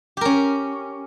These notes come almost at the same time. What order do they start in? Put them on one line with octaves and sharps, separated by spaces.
G4 A#4 C#4